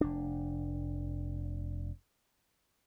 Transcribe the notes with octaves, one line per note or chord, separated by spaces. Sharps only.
F1 D4